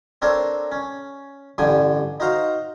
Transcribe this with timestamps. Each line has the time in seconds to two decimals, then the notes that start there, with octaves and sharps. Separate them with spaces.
0.22 C4 D4 A4 A#4 C5 C#5
0.72 C#4
1.58 A1 G2 D3 G5 G#5
2.20 D#4 F#4 C5 F5 A#5